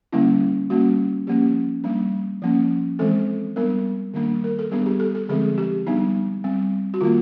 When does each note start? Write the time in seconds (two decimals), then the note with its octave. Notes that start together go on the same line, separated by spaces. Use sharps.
0.13 D3 G3 A#3 C#4 E4
0.70 G3 A#3 C#4 F#4
1.27 F3 A#3 C#4 G4
1.84 G3 A#3 D4
2.42 F3 A#3 C#4
2.99 E3 G#3 C4 A4
3.56 G3 B3 D4 A#4
4.14 D#3 G3 A#3 D4
4.44 A#4
4.59 A4
4.71 G3 B3 D4 G#4
4.86 G4
5.00 A4
5.15 A4
5.29 D3 F3 G#3 C4 G#4
5.58 G4
5.87 G3 B3 D4 D#4
6.44 G3 C4
6.94 F#4
7.01 D#3 G3 A#3 F4